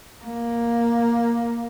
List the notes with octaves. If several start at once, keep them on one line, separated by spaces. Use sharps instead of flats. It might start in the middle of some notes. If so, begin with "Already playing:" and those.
A#3